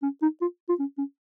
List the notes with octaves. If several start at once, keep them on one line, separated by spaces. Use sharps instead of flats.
C#4
D#4
F4
F4
C#4
C#4